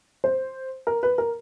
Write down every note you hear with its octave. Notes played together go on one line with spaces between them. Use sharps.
C5
A#4
B4
A#4